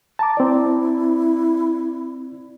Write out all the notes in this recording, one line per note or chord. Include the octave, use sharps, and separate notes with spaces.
A5 A#5 D6
C4 E4 D5